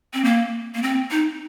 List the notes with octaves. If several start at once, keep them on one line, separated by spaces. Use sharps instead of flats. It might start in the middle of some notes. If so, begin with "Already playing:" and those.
C4
A#3
A#3
C4
D#4